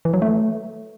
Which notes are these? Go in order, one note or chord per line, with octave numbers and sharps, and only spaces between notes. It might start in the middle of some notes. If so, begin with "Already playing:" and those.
E3
F#3
A3